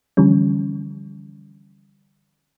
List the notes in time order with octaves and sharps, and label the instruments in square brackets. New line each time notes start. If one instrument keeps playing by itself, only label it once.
[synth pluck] D3 E3 F3 G3 C#4